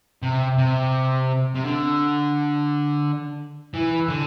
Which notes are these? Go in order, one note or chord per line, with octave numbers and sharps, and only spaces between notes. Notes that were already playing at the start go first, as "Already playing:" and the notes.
C3
C3
C3
D3
E3
D3